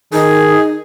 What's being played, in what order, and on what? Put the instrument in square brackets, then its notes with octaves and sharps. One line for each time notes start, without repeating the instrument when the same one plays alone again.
[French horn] D#3 [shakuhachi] D#4 [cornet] G#4